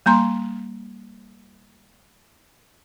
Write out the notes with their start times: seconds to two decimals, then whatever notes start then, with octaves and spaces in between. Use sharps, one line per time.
0.06 G3 A#3 A#5 C6